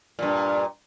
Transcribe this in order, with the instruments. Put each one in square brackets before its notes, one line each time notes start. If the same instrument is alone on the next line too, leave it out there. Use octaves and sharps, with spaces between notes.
[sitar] G2 A#2